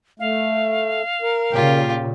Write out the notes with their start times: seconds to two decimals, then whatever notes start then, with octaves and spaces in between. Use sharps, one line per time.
0.20 A3 F5
1.22 A#4
1.52 A#2 C#3 F4 G4